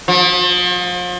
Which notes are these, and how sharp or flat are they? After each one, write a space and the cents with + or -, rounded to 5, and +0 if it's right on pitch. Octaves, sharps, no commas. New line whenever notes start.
F3 +40